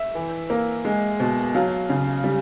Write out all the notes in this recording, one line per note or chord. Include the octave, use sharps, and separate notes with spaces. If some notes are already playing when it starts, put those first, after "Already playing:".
Already playing: E5
E3
A#3
G#3
B2
F#3 F5
C#3
G3